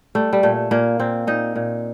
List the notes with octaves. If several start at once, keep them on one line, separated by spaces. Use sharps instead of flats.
G3 A3
G3
A#2 A3
A#2 A#3
A#2 C4
A#2 D#4
A#2